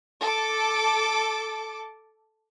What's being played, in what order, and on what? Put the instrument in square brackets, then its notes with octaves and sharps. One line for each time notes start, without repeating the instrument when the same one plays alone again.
[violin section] A4 D6